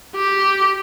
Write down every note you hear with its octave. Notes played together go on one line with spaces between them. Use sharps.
G4